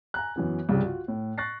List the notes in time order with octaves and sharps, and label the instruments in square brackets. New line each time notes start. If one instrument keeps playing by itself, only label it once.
[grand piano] G#5 A#5 F#6
F#2 E3 B3
C2 G2 C#3 F3 G3
F4 F#4
A2
C#6 F#6 A6 A#6 C7